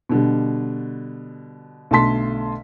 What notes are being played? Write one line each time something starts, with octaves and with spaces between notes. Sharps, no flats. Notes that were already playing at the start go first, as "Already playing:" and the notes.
B2 D3 G3
B1 D3 A3 A5 C6 B6